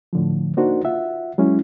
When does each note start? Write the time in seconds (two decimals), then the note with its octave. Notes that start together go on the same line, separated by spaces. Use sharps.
0.13 A2 D3 F3
0.57 A#3 D4 D#4 F#4 A#4 C5
0.85 F4 E5 F#5
1.38 F#3 G#3 C#4 E4